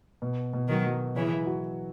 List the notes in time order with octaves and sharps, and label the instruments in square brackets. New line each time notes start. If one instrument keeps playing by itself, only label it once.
[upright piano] B2
B2
[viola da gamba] D#3 F#3
[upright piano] F#3
[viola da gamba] C#3 E3 [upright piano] C#5
[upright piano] F#4